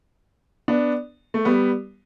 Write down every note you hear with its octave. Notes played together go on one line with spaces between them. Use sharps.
B3 D4
A3
G3 B3